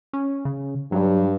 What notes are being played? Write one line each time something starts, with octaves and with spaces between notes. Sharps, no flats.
C#4
C#3
G2 F#3